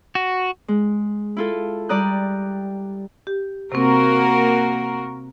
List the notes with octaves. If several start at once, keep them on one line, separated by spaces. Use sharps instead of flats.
F#4
G#3
E4 F4 A4
G3 G4 D5 A#5 D#6 F#6
G4
C3 A#3 C4 F#4 A#4